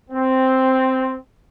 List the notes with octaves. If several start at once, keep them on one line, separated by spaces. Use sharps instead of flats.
C4